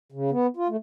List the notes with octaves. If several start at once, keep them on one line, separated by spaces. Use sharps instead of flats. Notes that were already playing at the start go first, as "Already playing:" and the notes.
C#3
B3
F4
A3